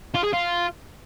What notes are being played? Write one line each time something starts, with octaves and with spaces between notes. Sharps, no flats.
F4
G#4
F4